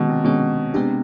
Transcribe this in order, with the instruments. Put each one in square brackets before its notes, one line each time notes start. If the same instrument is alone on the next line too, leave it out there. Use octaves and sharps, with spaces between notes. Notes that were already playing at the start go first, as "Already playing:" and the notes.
Already playing: [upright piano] B2 [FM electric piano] D#3 G#3 C#4
[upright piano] C3
[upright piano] B2 [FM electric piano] D#3 G#3 C#4
[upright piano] C3 [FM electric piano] G#3 B3 D4 G4